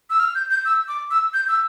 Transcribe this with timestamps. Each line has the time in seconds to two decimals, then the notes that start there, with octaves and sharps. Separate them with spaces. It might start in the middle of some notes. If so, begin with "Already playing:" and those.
0.10 E6
0.20 F6
0.35 G6
0.51 G6
0.65 E6
0.88 D6
1.11 E6
1.34 G6
1.48 E6